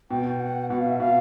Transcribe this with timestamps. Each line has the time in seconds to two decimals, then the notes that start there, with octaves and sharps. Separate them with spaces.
0.11 B2 G5
0.40 F#5
0.70 B2 F#5
0.80 F5
0.89 E5
1.00 B2 F5